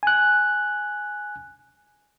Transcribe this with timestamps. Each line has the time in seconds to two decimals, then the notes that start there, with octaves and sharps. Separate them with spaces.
0.03 G#5 F#6